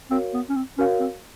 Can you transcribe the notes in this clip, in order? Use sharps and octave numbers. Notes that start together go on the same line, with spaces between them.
C4 F#4 A#4 C#5 F5
B3
C#4
C4
C#4 F#4 A#4 C#5 F5
C4